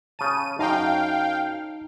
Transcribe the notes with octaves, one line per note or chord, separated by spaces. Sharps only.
C#3 A5 D#7
F#2 D#4 F5 G5 A5 A#5